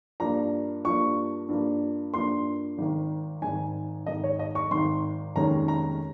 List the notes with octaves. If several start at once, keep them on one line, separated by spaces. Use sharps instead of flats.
G2 F3 A#3 A#5
G2 F3 A#3 C#6
G2 F3 A#3
G2 F3 A#3 C6
G#1 G#2 D#3
G#1 G#2 D#3 G#5
G#1 G#2 D#3 D#5
C#5
D#5
C#6
G#1 G#2 D#3 C6
F1 D#2 D#3 G#3 C#4 A#5
A#5